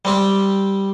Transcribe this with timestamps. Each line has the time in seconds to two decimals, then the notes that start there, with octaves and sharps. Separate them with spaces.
0.05 G3 C4 G4